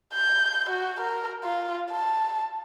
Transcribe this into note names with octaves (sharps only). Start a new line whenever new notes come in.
G6
F#4
A#4
F4
A5